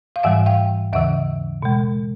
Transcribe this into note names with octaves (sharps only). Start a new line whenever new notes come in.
F5
G#2 E3 G3 E5 F#5
F5 G5
D#2 C#3 E3 E5 F#5
B2 G#3